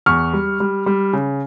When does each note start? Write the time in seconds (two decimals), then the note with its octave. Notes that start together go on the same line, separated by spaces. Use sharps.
0.06 E2 C#6 F6
0.33 G3
0.60 G3
0.86 G3
1.13 C#3